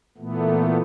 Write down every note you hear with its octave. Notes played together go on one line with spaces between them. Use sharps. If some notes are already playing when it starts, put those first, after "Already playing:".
A#2 E3 A3 B3